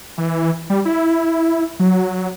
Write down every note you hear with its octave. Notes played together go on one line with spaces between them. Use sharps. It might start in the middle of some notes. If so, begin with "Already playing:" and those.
E3
G3
E4
F#3